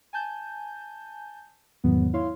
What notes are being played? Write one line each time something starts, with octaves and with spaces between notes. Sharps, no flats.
G#5 A5 G6
E2 G#2 D#3 F#3 B3
E4 C#5 F5 C6